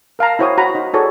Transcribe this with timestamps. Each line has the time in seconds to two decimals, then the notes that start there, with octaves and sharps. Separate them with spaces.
0.19 A#4 F5 A5 A#5
0.39 E4 F#4 C5 C#5 G5 D#6
0.58 F#4 A#5 B5
0.75 D#4
0.93 E4 F#4 G#4 A4 C#5 D5